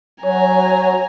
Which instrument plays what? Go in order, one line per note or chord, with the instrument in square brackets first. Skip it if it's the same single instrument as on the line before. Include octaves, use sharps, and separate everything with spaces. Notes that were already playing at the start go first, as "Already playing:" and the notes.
[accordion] F#3 [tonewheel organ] C#5 [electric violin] G#5 A#5